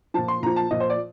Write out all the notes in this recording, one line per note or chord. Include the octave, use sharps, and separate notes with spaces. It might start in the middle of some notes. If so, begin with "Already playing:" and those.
A#2 F3 A5
C6
A#2 F3 A#5
A5
A#2 F3 D#5
C5
D5